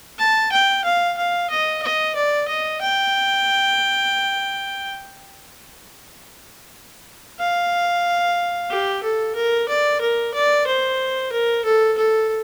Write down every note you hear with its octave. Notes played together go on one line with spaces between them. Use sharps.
A5
G5
F5
F5
D#5
D#5
D5
D#5
G5
F5
G4
A4
A#4
D5
A#4
D5
C5
A#4
A4
A4